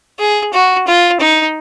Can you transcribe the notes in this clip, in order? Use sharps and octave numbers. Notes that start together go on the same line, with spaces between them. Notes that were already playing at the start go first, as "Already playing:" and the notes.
G#4
F#4
F4
D#4